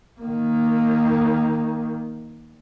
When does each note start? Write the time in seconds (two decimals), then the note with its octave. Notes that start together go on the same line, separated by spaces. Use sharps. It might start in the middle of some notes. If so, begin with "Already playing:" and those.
0.20 D#3 A#3